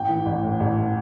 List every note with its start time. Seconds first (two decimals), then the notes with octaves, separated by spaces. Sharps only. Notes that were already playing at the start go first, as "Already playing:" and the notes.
Already playing: A1 G5
0.09 E3
0.26 A1
0.43 A2
0.60 A1
0.77 E3